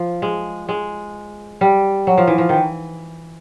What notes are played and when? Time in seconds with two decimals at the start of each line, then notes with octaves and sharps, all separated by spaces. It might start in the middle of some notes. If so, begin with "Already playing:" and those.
Already playing: F3
0.22 G#3
0.69 G#3
1.61 G3
2.07 F#3
2.18 F3
2.27 E3
2.38 F3
2.49 D#3 E3